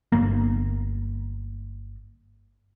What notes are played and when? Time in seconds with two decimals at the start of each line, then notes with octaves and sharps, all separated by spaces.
0.12 G1 A#3